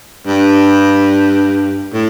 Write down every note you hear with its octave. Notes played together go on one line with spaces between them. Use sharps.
G2
A2